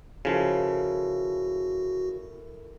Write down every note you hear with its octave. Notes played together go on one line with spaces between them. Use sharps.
C#3 F3 E4 F#4 A4 A#4